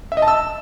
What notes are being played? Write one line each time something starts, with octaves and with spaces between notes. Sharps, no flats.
E5
D#5
A5
E6